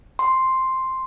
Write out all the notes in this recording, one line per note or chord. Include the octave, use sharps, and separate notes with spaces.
C6